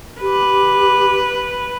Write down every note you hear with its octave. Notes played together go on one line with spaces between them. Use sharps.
G4 B4